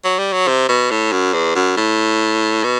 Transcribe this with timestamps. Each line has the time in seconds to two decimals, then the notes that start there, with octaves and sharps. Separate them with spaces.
0.04 F#3
0.19 G3
0.33 F#3
0.48 C3
0.69 B2
0.91 A2
1.12 F#2
1.34 E2
1.55 F#2
1.77 A2
2.64 B2